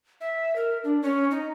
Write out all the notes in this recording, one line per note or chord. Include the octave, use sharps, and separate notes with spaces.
E5
A#4
D4
C#4
D#4